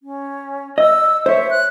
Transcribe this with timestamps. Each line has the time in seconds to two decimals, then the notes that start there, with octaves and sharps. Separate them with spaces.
0.03 C#4
0.78 D#5 E6
1.26 C5 C#5 E5
1.50 F#6